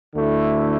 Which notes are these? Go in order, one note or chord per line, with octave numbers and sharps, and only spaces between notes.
D2 D3 A3 E4